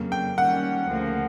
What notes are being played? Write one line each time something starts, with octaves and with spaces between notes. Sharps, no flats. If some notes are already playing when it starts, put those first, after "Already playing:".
Already playing: F2 C#3 F#3 A#3
G5
D#3 G3 A#3 C#4 F#5
D2 C#3 F3 A#3